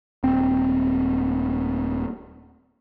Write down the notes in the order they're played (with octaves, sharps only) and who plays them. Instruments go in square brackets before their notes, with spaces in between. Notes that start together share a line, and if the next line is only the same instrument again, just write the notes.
[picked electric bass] D#1 C4